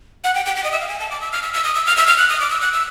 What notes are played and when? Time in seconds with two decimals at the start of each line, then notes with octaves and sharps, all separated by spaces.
0.24 F#5
0.35 G5
0.46 G5
0.56 G5
0.64 D#5
0.72 E5
0.81 F5
0.89 G#5
1.00 A5
1.11 D6
1.21 E6
1.32 F6
1.43 E6
1.54 E6
1.64 D#6
1.75 E6
1.86 F6
1.97 E6
2.07 F6
2.18 F#6
2.29 D#6
2.40 D6
2.50 E6
2.61 F#6
2.73 E6